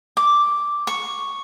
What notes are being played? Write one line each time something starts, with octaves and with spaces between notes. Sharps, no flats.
D6
C#6